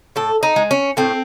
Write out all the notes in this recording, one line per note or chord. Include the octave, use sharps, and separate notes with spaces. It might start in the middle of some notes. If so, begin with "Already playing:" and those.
A2 A4
D#4
G#3
C#4
A2 C4